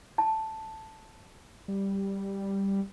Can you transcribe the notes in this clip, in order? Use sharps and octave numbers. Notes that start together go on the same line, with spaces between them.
A5
G3